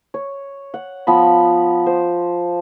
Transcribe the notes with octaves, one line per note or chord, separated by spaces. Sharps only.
C#5
F#5
F3 B3 B5
C5